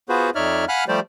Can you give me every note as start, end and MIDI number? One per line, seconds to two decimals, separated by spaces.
0.09 0.30 59
0.09 0.30 65
0.09 0.30 66
0.09 0.30 68
0.09 0.30 71
0.09 0.30 72
0.35 0.65 41
0.35 0.65 63
0.35 0.65 73
0.35 0.65 74
0.35 0.65 76
0.35 0.65 89
0.69 0.84 77
0.69 0.84 78
0.69 0.84 80
0.69 0.84 83
0.69 0.84 89
0.69 0.84 90
0.88 1.00 53
0.88 1.00 55
0.88 1.00 57
0.88 1.00 67
0.88 1.00 72
0.88 1.00 74